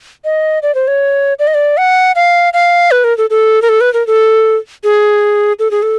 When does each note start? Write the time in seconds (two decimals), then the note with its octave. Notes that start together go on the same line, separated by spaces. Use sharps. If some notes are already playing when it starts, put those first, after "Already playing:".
0.24 D#5
0.63 D5
0.75 C5
0.88 C#5
1.39 D5
1.47 D#5
1.54 D5
1.77 F#5
2.16 F5
2.53 F5
2.91 B4
3.04 A#4
3.18 A4
3.30 A4
3.62 A#4
3.69 A4
3.81 B4
3.94 A#4
4.07 A4
4.84 G#4
5.59 A4
5.71 G#4
5.82 A4